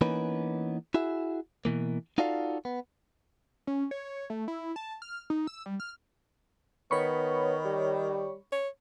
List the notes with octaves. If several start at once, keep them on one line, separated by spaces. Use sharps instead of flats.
E3 A#3 B3 C#4 D#4 B4
E4 F#4 G#4 E5
B2 E3 A#3
D#4 F4 F#4 A4 D5 F5
B3
C#4
C#5
A3
E4
A5
F6
D#4
E6
G3
F6
D#3 B3 C#5 B5 C#6
G3
C#5